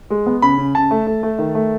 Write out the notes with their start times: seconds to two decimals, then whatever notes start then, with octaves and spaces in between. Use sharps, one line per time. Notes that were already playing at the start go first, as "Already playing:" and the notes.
0.10 G#3
0.26 B3
0.42 C#3 B5
0.58 C#3
0.75 C#3 A5
0.91 A3
1.07 A3
1.23 A3
1.39 D#3
1.55 A3